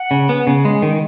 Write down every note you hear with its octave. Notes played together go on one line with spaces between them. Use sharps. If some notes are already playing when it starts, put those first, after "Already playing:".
Already playing: F#5
C#3
B3
C#3
G#3
D#3